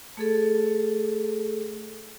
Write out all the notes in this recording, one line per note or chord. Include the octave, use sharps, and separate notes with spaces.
A3 G#4 A4